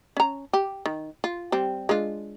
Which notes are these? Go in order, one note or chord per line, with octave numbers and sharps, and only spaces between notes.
C#4 A#5
G4
D#3
F4
G3 C4
G#3 D4 F4